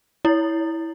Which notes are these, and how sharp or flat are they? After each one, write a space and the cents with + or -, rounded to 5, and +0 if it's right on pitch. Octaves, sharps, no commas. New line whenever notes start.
E4 -10 C#5 +20